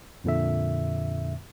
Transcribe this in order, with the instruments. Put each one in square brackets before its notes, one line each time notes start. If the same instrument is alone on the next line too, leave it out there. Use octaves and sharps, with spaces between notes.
[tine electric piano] F2 A#2 D3 E5